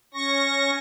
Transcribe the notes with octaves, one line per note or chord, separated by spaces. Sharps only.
C#4 C#6 A#6